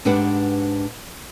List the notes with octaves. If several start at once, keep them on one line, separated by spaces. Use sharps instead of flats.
G#2 D4 G4 B4 F#5